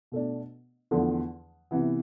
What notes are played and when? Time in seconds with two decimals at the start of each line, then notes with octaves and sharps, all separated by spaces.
0.12 B2 A3 D4
0.91 E2 D3 F3 A3
1.71 C3 E3 B3